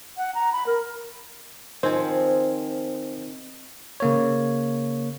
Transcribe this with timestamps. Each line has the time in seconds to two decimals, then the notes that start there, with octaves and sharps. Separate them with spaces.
0.17 F#5
0.35 A#5
0.52 B5
0.67 A#4
1.83 D#3 F3 C4 C5 G#5
4.00 C#3 A#3 C#5